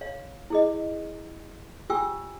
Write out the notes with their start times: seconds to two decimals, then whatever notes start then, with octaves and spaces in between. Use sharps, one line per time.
0.01 C#5 F5
0.50 E4 G#4 D#5
1.90 F4 G4 G5 G#5 C#6 E6